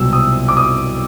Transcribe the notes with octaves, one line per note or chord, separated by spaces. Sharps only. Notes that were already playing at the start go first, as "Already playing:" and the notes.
Already playing: C2 B2 F#3 E6
D#6
D6
D#6